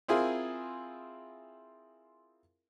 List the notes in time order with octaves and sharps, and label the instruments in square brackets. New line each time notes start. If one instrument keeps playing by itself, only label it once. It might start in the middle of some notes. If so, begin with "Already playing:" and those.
[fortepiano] C4 E4 F4 G#4 A#4